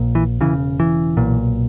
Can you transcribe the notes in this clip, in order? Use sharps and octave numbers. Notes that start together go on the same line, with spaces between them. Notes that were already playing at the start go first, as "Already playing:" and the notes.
Already playing: A#1 A#2
E3
E1 D#2 C#3 E3
E3
B1 A#2